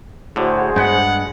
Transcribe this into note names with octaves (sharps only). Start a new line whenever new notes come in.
A2 D3 F#4 G#4 C5
G2 G#3 B3 D4 F#5